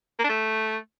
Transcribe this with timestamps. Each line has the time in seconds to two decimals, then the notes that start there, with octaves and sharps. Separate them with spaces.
0.19 A#3
0.24 D4
0.29 A3